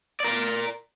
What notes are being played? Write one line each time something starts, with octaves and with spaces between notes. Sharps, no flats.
A#4 D5